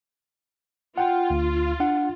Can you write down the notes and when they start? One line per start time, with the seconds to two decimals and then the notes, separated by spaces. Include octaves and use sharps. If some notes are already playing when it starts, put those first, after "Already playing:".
0.98 F4 F#5 G5
1.30 D2
1.80 D4 F#5